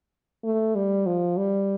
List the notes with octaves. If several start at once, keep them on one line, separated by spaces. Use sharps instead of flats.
A3
G3
F3
G3